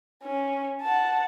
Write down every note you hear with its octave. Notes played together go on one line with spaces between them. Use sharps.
C#4
F#5 A5